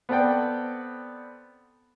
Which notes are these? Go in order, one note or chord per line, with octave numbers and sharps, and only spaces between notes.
B3 C4 A4 D5 F#5 G5